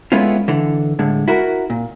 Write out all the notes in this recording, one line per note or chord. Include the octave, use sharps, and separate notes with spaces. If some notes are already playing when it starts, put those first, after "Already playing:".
G#3 A3 B3 C#4 E4 F4
D3 E3
A2 D3 G#3
E4 F#4 A#4
A#2